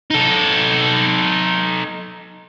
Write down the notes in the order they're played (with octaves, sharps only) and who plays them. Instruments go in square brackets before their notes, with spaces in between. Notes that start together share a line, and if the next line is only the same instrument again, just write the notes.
[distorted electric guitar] D#4 A4